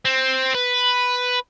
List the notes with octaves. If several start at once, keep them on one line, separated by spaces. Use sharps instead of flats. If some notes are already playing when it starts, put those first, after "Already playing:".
C4
B4